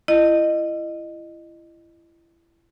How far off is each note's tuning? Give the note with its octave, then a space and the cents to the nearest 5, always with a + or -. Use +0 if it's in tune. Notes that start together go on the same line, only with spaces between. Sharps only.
E4 +30 D#5 -20